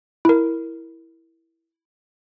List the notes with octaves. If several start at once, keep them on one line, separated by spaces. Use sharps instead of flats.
E4 A#4